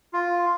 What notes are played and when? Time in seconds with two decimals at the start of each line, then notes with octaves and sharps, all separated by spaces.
0.13 F4